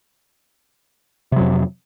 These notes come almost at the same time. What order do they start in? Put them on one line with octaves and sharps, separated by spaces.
C3 F#3 F2